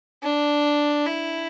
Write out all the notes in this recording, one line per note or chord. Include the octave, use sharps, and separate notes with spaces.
D4
E4